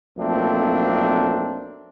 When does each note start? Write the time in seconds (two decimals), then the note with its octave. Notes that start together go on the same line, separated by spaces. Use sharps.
0.18 B1 F2 A3 A#3 C4 D4